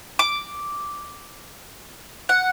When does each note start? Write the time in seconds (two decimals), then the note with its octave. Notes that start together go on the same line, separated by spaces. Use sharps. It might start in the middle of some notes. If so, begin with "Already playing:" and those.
0.19 D6
2.29 F#5